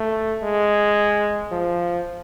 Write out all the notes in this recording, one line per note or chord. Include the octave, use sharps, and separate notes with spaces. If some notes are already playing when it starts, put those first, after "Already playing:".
Already playing: A3
G#3
F3